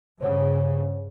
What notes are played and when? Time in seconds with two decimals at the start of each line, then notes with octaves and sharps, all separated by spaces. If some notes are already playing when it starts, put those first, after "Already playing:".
0.21 G2 C#3 C5 C#5 F#5